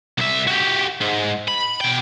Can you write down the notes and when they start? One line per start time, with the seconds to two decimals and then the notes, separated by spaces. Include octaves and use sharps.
0.18 C2 E5
0.47 F#4 G4
1.01 G#2
1.48 B5
1.81 B2 G5